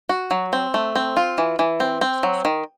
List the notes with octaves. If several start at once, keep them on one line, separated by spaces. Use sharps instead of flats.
F#4
F#3
C4
A3
C4
F4
E3
E3
C4
C4
F#3
D#3